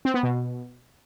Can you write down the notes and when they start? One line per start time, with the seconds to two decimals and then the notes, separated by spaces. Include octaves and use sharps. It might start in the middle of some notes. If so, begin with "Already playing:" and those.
0.05 C4
0.14 B3
0.23 B2